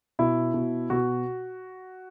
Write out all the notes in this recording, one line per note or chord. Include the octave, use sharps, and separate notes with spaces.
B2 E4
B2
B2 F#4